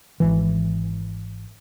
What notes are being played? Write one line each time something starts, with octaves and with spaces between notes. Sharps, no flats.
G#1 E3